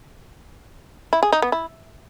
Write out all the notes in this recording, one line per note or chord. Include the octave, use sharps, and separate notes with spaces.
E4
G#4
D#4
B3
E4